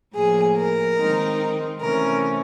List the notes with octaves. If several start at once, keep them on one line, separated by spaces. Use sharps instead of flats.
A2 F3 A#3 G#4
A#4
D#3 G#3 C4 D#4
C3 E3 A3 C#4 A#4